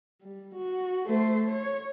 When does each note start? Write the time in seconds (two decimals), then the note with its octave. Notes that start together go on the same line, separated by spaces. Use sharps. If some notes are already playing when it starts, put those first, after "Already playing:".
0.22 G3
0.55 F#4
1.06 A3 C5
1.48 C#5